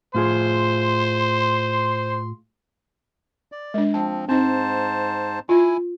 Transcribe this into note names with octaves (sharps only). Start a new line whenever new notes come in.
A2 F4 G#4 C5 C6
D5
G#3 D4
F3 C4 A5
G#2 C4 D#4 C5 A5
E4 F4 G#5